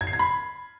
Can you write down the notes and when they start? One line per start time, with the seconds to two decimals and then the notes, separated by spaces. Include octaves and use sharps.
0.01 G#6
0.07 C7
0.13 G#6
0.19 B5